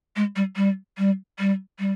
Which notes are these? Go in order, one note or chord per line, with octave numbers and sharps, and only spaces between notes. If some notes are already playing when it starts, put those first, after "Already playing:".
G#3
G3
G3
G3
G3
G3